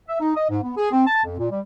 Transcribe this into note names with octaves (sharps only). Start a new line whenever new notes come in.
E5
D#4
D#5
G#2
B3
G#4
C4
A5
F2
A#2
G3